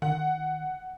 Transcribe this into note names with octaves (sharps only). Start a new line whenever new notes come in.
D#3 F#5